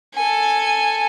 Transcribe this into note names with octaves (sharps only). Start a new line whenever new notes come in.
A4 G#5